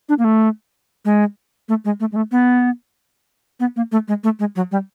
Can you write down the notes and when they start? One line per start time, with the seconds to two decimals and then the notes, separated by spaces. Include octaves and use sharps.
0.09 D4
0.19 A#3
0.24 A3
1.05 G#3
1.69 A3
1.85 G#3
2.00 A3
2.12 G#3
2.16 A3
2.32 B3
3.60 B3
3.76 A#3
3.92 A3
4.08 G#3
4.24 A3
4.40 G#3
4.56 F#3
4.72 G3